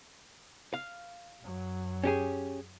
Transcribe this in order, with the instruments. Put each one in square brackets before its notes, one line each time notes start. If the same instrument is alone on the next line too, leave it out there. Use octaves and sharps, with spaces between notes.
[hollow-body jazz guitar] F5
[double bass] F#2 F#3
[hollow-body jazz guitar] C#4 G4 G#4